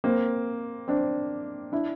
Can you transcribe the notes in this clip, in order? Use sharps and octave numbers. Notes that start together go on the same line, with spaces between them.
A#3 C4
C4 D4
D4 E4